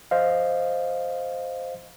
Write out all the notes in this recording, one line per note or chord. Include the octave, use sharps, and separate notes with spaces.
C5 D#5 F5